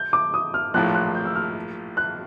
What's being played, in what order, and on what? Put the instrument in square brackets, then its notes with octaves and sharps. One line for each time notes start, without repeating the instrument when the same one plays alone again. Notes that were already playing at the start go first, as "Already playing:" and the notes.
Already playing: [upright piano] G6
D6
D#6
F6
[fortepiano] A#1 A2 F3 [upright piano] F#6
[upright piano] F#6
G6
E6
F6
F#6